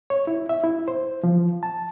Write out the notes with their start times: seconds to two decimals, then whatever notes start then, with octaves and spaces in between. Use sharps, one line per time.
0.10 C#5
0.27 E4
0.49 E5
0.63 E4
0.88 C5
1.23 F3
1.63 A5